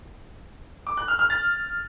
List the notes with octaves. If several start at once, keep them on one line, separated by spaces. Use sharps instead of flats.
D6
F#6
F6
F6
A6